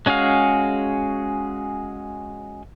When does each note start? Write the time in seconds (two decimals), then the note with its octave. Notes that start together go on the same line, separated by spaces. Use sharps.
0.06 G#3 C#4 F#4 G#4 F5